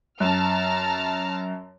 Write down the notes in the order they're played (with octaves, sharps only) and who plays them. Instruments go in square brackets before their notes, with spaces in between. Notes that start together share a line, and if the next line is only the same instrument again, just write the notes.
[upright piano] F#2 [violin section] A5 A#5 F6